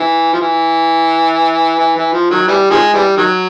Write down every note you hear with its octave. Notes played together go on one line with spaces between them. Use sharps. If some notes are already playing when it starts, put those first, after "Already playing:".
Already playing: E3
F3
E3
E3
E3
F3
D#3 F#3
E3 G3
D#3 F3 G#3
E3 G3
D#3 F#3